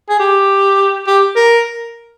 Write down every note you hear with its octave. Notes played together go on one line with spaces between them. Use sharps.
G#4
G4
G4
A#4